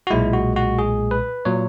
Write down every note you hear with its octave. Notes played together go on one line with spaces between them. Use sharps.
F#4
B1 A#2 G#3 E4
F#4
F#4
G#4
B4
A#2 F#3 C#5